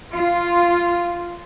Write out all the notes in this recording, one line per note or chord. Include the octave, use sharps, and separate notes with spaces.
F4